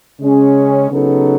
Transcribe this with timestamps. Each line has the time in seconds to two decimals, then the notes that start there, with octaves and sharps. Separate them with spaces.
0.20 C#3 G#3 C#4 G#4
0.91 C#3 F#3 B3 D#4 A4